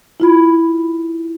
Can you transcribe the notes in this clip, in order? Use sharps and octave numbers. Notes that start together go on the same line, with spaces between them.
E4 F4 B5